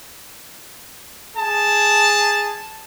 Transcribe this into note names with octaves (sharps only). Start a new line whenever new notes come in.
G#4 A5